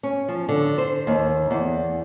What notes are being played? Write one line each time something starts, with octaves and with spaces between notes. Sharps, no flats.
C#4
F3
D3
C5
D#2
E2